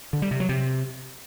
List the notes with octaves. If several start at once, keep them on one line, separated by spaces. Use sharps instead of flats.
D3
G3
C3
F#3
C3